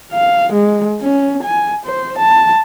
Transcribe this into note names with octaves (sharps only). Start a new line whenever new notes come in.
F5
G#3
C#4
G#5
C5
A5